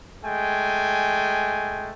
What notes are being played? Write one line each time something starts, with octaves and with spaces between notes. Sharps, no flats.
G#3 A3 G5 G#5